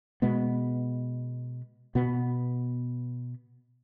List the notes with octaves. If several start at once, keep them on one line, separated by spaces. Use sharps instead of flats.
B2 G#3 B3
B2 B3